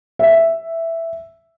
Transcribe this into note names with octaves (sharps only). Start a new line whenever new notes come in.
E5